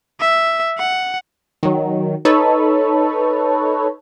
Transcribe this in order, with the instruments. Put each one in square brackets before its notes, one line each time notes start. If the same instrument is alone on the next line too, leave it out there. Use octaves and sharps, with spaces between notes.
[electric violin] E5
F#5
[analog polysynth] D#3 F#3
D#4 A4 B4 C#5